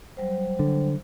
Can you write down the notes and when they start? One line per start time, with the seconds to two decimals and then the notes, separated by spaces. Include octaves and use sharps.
0.17 F#3 G3 C5
0.59 D3